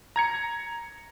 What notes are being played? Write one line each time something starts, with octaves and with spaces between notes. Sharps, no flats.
A#5 G#6 C#7